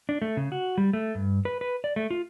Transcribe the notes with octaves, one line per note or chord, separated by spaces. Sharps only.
D4
A3
C#3
F#4
G3
A3
G2
B4
B4
D5
A3
F4